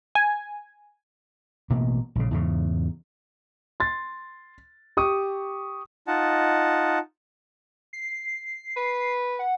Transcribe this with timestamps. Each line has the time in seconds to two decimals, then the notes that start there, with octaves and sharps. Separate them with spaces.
0.15 G#5
1.70 A1 B2 A#3
2.15 A#1 C#3
2.31 E2 G#2 C#3
3.80 C6 A6
4.97 G4 C#6 D#6
6.08 D#4 F4 D#5 F#5 A5
7.93 C7
8.76 B4
9.39 F#5